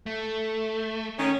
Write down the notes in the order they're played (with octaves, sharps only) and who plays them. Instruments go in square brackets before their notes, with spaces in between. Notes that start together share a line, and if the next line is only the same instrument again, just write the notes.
[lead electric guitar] A3
[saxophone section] D#3 C#4